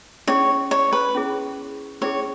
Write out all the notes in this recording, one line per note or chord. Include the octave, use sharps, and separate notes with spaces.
C#4 E4 G#4 C#5
C#5
B4
C#4 E4 G#4
C#4 E4 G#4 C#5